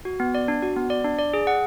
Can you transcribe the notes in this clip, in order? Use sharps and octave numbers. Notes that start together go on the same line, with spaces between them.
F#4
B3
D5
D4
F#4
B3
D5
D4
D5
G#4
F#5